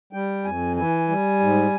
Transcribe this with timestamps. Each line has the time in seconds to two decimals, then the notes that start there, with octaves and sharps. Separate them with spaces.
0.13 G3 G5
0.44 F2 G#5
0.76 E3 G#5
1.08 G3
1.40 G#2